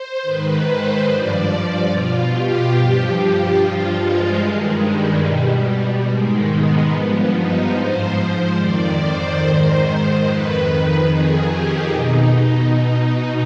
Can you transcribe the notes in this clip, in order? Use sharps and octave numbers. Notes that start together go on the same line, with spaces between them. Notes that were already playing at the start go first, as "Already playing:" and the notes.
Already playing: C5
G#2 D#3 B4
C5
G2 F3 D5
D5
B2 F4
G4
G2 F3
G2 F3 F4
G#3
G2 D#3 G#3
G3
B2
G3
G#2 D#3 G#3
B3
G2 F3
D#4
G#2 F3 C5
F2 D#3 D5
C5
G#2 D#3
F2 D#3 B4
B4
F2 D#3 G#4
G4
B2 D#4